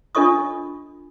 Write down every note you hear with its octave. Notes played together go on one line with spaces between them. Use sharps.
D4 F4 A4 D#5 C#6 D#6